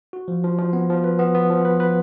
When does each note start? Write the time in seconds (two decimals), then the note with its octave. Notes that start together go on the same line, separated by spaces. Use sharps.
0.13 F#4
0.28 F3
0.44 F3
0.59 F3
0.73 B3
0.89 F3
1.04 B4
1.19 B3
1.35 B3
1.50 F3
1.65 B4
1.80 B4